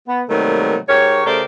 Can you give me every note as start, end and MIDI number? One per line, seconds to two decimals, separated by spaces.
0.07 0.21 59
0.28 0.76 48
0.28 0.76 51
0.28 0.76 54
0.28 0.76 55
0.28 0.76 57
0.28 0.76 58
0.89 1.22 44
0.89 1.22 67
0.89 1.22 70
0.89 1.22 73
1.26 1.42 49
1.26 1.42 57
1.26 1.42 67
1.26 1.42 70
1.26 1.42 72
1.26 1.42 74